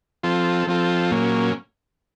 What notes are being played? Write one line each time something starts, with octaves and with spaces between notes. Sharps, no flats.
F3 C4 F4 A4
F3 C4 F4 A4
A#2 F#3 A#3 C#4